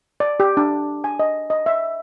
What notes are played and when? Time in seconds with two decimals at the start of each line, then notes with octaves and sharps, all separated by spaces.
0.20 D5
0.40 G4
0.57 D4
1.04 G#5
1.19 D#5
1.50 D#5
1.66 E5